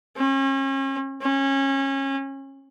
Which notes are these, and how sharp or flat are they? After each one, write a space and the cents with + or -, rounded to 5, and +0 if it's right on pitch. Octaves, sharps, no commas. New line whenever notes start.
C#4 -35
C#4 -25